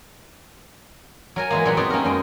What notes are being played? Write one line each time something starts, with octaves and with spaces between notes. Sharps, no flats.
F#3 A#4 G#5
E3 G#3 A#3
A#2 F#3 G3 A#3 F#5 B5
B3 C4 D#4 C#5 D5
A3 A#3 C#4 F#4 A#4
F#2 G#3 G5